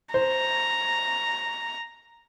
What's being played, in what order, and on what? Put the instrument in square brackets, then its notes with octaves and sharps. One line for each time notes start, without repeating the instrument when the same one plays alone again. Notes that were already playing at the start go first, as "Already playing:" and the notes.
[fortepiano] C5 [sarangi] A#5